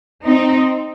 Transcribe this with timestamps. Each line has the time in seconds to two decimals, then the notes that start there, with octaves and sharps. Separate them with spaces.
0.24 C4 D#4